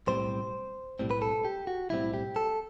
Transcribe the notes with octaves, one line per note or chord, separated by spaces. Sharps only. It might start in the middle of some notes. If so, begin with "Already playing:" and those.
B1 A2 G3 C4 C5
B1 A2 G3 C4
B4
A4
G4
F#4
B1 A2 G3 C4 E4
G4
A4